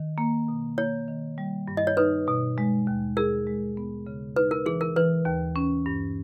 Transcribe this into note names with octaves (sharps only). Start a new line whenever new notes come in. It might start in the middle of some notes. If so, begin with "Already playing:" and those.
Already playing: D#3
A#3
B2
A#3 C#5
D#3
G3
G2
D#5
C#5
D#4 B4
B2
G#3
D#2
G#4 A#4
G#3
B3
C#3
D#4 B4
A#4
E3 G#4
A#4
E3 B4
D#2
C#4
G2